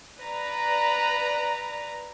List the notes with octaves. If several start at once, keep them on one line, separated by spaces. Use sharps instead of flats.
B4 D5 A#5